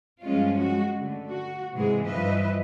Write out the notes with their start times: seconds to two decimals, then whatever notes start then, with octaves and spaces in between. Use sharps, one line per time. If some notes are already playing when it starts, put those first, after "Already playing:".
0.22 G2 F3 G#3 C#4 F4
0.61 G#3 F#4
0.98 D3 A3
1.29 F#4
1.74 G#2 C3 E3 G#3 G#4
2.06 G2 E3 F3 B4 D#5 E5